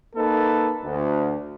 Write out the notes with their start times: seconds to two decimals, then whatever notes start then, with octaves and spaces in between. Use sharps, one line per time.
0.16 A#3 D#4 A4 B4
0.84 D2